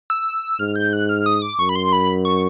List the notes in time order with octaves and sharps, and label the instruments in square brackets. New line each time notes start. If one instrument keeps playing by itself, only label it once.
[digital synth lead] E6
[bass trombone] G#2 [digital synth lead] F6
[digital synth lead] G6
F#6
F6
D#6
D6
[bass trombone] F#2 [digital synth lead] C#6
[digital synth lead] B5
C6
B5
C#6